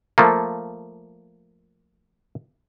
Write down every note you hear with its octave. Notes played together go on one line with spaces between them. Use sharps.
F3 A3 A#3